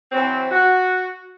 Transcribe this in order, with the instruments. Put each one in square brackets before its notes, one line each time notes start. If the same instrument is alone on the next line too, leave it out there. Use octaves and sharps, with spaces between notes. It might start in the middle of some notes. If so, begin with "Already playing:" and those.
[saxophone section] E3 F#3 C4
F#4